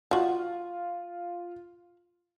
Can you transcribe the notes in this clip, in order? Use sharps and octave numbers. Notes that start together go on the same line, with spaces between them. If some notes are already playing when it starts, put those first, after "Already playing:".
F3 F4 F#4